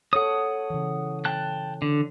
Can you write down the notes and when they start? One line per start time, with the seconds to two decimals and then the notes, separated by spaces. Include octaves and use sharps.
0.13 A4 C#5 F#5 D#6
0.70 C#3 E3
1.25 G5 A5 F#6
1.82 D3